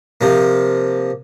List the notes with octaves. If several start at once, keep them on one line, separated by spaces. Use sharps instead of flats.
C3 F3 A#3